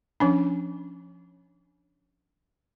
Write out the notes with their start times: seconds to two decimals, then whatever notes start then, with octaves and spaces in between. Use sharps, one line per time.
0.20 F3 C#4 D4